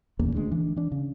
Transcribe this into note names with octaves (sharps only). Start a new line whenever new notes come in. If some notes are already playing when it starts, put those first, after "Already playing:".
D#1 E2 C#3 A#3
D2 G#3 D4
E3 D4
E3 D4
C#3